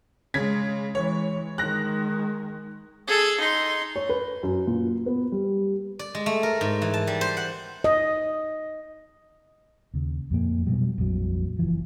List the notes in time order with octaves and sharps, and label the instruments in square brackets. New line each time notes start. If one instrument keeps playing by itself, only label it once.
[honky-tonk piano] C#3 G#6 B6 [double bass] G#3
[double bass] E3 G#3 [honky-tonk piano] C#5
[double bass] D#3 G#3 [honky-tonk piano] F#6 A#6
[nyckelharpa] G#4 A4
D#4 C6
[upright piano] C#5
B4
F#2
A#2
B3
G3
[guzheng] D5
G#3
A3
A#4
G#2
E3
A5
G3
C5
F#5
[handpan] D#5
[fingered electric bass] D#2 C#3
F2 A#2 A#3
B2 F#3 G3
A#1 F2 F#3 G3
F#1 E3 F3